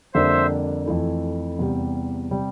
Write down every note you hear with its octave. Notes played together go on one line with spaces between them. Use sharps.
F2 D3 G3 A#3 D4 C5 E5
F2 E3 A3
E2 C3 G3
C3 G3